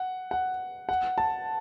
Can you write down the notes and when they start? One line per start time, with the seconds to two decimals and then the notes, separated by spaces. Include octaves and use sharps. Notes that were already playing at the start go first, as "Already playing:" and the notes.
Already playing: F#5
0.31 F#5
0.89 F#5
1.18 A5